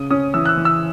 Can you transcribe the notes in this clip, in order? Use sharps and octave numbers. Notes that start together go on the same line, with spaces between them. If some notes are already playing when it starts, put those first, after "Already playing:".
Already playing: C#3 D#6
C#4 D#6
E3 E6
F#6
E6
E3
E6